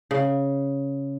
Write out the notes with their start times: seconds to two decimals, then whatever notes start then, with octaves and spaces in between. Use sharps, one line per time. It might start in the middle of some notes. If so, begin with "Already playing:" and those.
0.11 C#3